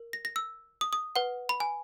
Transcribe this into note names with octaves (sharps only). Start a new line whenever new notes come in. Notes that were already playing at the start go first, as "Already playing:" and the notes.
Already playing: A#4
A#6
A#6
E6
D#6
D#6
B4 F#5
B5
G#5